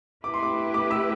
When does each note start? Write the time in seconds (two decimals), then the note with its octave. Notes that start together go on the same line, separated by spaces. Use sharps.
0.24 A3 E4 G4 B4 D6
0.34 C6
0.43 D6
0.74 D6
0.91 E6